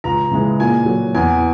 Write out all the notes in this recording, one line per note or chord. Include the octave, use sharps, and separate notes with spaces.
C#2 A#5
C#3 E3 G#3
A#2 G#5
F#3
E2 G#5